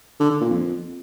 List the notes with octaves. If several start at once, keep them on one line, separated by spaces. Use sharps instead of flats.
D3
D3
A#2
F2